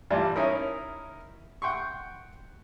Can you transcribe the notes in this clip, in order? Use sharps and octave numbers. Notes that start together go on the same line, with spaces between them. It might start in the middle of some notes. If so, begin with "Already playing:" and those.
G2 E3 G3 D4 F4
C#4 D#4 E4 A#4
F#5 G5 C6 C#6